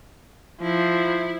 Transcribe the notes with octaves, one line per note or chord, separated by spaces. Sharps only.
F3 E4